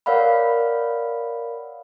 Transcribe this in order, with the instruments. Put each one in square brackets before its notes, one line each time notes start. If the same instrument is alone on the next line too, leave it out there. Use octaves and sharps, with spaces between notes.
[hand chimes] A#4 C#5 D5 F5 F#5 B5